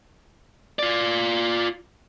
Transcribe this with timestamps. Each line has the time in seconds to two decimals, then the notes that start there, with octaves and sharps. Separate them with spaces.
0.79 F4 D5